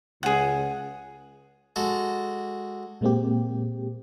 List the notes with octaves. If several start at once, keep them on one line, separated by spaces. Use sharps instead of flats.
C#2 G#4 F#5
G#3 F#4 A4
A#2 G#3 A#3 C4 G4